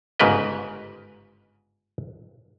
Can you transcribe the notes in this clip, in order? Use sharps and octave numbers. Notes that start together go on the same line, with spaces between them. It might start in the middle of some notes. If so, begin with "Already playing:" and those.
G1 G#2 C#3 A#4 B4 D#5